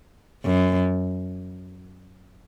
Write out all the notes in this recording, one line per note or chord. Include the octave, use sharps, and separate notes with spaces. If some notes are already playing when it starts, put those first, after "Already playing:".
F#2